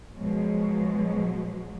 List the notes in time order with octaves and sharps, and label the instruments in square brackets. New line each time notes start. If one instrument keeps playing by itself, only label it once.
[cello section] B2 F3 F#3 G#3